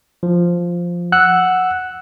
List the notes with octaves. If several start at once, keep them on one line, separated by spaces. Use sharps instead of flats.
F3
F#5 E6 F#6